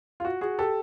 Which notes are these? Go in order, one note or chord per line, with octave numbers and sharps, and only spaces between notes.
F4
F#4
F#4 G#4
G4 A4